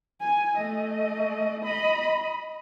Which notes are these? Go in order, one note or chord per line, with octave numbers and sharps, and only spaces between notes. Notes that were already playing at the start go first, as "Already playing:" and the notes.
G#5
A3 D#5
D#5 B5